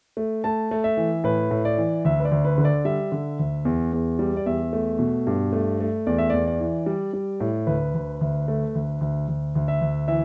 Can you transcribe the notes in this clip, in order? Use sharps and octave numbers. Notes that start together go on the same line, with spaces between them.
A3
A3 A5
A3
E5
E3
A2 B4
A2
D5
E3
D2 E5
B4
D5
D2
B4
D3
D5
G3 E5
D3
D2
E2
E2
G3
D5
E2 E5
A3
B2
G2
A3
A3
E2 D5
E5
E2 D5
D5
E3
G3
G3
A2
D2 B4
D2
D2
A3
D2
D2
D2
D2
E5
D2
E3 E5